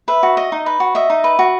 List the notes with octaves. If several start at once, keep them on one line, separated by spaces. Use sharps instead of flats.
B4 E5
F#4
D#5
D#4
B4
F#4
D#5 E5
D#4
B4
F#4